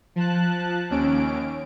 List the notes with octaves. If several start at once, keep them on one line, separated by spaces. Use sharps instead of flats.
F3 A5 F#6
D#2 C#4 D7